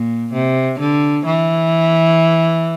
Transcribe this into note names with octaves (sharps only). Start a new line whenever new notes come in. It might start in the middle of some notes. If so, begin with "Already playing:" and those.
Already playing: A#2
C3
D3
E3